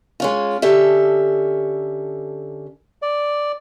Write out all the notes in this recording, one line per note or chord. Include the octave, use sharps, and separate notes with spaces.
G#3 C#4 F4
D3 C#4 G4 A4 E5
D5